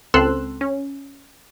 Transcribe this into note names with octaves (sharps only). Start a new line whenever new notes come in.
C#2 C4 A4 C6 E6 F#6
C#4